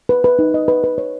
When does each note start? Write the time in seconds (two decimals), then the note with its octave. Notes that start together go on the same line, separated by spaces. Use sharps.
0.09 B4
0.24 B4
0.39 D#4
0.54 D#5
0.68 B4
0.84 B4
0.98 C#5